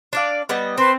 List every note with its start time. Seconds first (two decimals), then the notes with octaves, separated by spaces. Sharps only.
0.13 D4 D5 F5
0.49 G3 B3 D#5
0.78 C4 B4 C5 C6